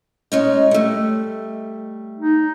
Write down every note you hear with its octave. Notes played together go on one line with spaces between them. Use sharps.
G#3 C#4 D#4
G3 A3
D#4